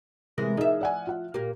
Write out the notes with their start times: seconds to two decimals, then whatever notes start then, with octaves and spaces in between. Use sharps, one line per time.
0.38 C3 E3 G#3 A#4
0.57 F3 D#4 G#4 A#4 E5
0.81 D5 F#5 G#5
1.07 F4 F#5
1.34 A#2 A#3 G4